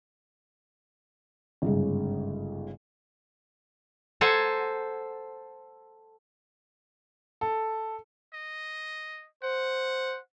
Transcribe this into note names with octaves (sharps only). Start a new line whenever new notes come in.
G1 G#2 C#3
A4 C5 F#5 G#5 A#5
A4
D#5
C5 F#5